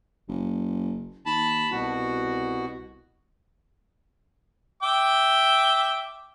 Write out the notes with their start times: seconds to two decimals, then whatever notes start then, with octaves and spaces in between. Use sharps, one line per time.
0.28 F#1
1.26 D#2 A5 B5
1.72 C2 B2 F#4
4.83 E5 G5 D6